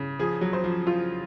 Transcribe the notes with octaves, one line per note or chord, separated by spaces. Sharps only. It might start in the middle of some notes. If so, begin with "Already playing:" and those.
Already playing: C#3
F3 G#4
F#3
C5
F3
F4